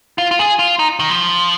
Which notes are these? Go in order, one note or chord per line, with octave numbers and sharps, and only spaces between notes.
F4
F4
G#4
F4
D#4
D#3
F3